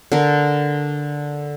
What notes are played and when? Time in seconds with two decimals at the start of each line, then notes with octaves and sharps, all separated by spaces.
0.12 D3 A#4